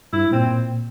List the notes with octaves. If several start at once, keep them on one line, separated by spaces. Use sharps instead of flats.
G2 E4
A#2 C4